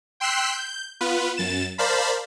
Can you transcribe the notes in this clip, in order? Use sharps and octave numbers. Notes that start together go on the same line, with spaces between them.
G5 C6 E6 F#6 B6 C7
G6
B3 F4 B4
F#2 A6 E7
A#4 C5 D5 F5 A5 B5